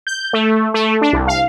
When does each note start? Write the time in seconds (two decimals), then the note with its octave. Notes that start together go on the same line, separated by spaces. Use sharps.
0.07 G6
0.33 A3
0.74 A3
1.02 D4
1.13 C2
1.28 F5